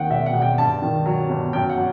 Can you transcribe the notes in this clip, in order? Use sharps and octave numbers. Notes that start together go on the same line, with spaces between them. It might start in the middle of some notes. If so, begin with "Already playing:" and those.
Already playing: D#2 D#3 F#5 G5
E1 E5
F#5
E1
G5
G2 A5
D#3
F#3
G1
F#2 G5
F#5
F#3